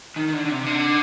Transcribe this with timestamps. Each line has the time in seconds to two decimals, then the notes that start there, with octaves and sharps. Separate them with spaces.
0.16 D#3
0.28 D#3
0.33 D3
0.45 D3
0.50 C3
0.66 D3